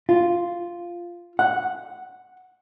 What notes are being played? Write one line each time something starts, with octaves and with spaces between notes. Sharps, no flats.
F4
F#5